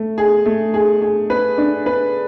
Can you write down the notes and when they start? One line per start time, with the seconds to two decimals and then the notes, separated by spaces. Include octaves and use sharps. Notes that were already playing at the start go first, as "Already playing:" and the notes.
Already playing: A3
0.18 G#4
0.45 A3
0.74 G#4
1.02 G#4
1.30 B4
1.58 D4
1.86 B4